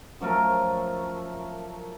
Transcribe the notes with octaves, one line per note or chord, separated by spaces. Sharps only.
F#2 F3 A3 A#4